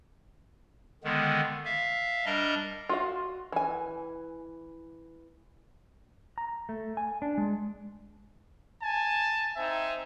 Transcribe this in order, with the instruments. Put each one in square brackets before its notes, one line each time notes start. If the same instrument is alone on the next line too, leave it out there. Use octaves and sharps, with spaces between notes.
[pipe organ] D3 D#3 G#3 B3
E5 F5
G3 D4 A#4 D#5 A#5
[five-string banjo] F4 F#4 F5
E3 G#5
[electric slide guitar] A#5
A3
G#5
D4
G#3
[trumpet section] G#5 A5
C4 D#4 E5 G#5